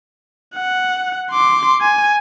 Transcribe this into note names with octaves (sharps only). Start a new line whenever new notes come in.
F#5
C6 D6
G#5